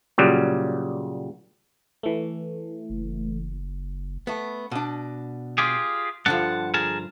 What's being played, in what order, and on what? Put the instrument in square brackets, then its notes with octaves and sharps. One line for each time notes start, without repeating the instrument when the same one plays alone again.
[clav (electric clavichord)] A#2 C#3 F#3 G3
[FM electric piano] E3 A3
[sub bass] F#1
[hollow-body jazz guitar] A3 B3
B2 D4
[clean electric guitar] F4 G4 G#4
[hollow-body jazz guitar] G2 D3 F3 [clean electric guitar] F#5 A5
[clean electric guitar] G#4 A#4 A5